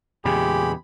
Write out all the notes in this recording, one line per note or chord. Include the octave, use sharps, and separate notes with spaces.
E2 A#2 C#3 G#3 G4 B5